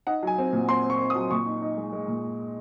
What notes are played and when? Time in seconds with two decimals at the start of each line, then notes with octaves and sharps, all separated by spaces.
0.07 D#4 F#5
0.23 F#3 G#5
0.38 C4
0.53 A#2
0.69 C4 C6
0.84 C4
0.90 C#6
0.99 C4
1.10 D#6
1.15 F#3
1.31 A#2 C#6
1.46 D#4
1.62 D#4
1.77 G#3
1.93 G#3
2.08 A#2